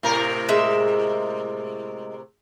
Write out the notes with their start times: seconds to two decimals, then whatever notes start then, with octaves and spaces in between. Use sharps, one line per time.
0.03 A2 C3 A#4
0.49 G#3 E5